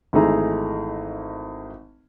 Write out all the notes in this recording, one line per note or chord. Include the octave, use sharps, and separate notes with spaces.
G#1 E3 A3 D#4 G#4 A#5